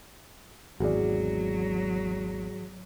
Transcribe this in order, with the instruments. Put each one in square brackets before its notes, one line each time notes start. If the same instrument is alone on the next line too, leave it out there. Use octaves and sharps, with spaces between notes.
[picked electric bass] G#1 E2 [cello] F#3 [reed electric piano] F#4 G#4 D5